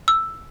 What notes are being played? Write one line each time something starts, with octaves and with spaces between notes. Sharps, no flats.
E6